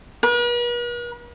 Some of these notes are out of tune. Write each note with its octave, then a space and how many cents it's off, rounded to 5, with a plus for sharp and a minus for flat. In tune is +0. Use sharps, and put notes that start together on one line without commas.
B4 -45